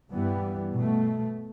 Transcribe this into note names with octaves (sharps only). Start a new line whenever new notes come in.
G2 E3 G3 B3
B2 A3